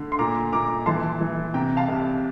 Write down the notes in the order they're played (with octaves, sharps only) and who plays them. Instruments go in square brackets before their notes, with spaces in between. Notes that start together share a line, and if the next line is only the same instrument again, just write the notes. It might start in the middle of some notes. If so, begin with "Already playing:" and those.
Already playing: [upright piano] D3 A3
C6
A#2 A#5 D6
A#2 A#5 D6
E3 A5 C6
E3
C3 G5 A#5
F5 A5
C2